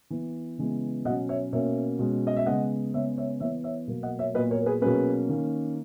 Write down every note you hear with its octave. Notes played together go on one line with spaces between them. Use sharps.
E3 B3
C#3 E3 G#3 B3
B2 F#3 C#4 D#5 F#5
C#5 E5
B2 A#3 C#4 C#5 E5
B2 G#3 C#4
D#5
E5
C#3 G#3 B3 D#5 F#5
C#3 G#3 B3 C#5 E5
C#5 E5
E3 B3 C#5 E5
C#5 E5
B2 F#3 A#3
D#5 F#5
C#5 E5
A#2 F#3 B3 B4 D#5
A#4 C#5
A#4
G#4 B4
B2 F#3 A#3 C#4 G#4 B4
D#3 A#3 C#4